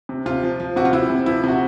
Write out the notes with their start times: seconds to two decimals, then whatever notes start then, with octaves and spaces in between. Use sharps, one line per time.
0.09 C3
0.26 C3 F4
0.43 F3
0.60 F3
0.76 C3 F#4
0.85 F4
0.93 C3 E4
1.10 C3
1.26 F3 E4
1.44 C3 F#4